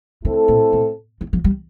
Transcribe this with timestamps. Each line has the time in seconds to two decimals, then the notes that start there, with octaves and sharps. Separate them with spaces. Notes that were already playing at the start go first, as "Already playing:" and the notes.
0.24 D3 A3 C4 E4 A4
0.48 A#2
0.73 A#2
1.21 E3
1.33 F3
1.44 G3